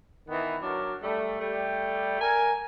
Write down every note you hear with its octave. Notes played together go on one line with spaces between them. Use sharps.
D#3 E3 B3
F#3 D4 A#4
G3 A3
G3 A3 G4
A#4 G#5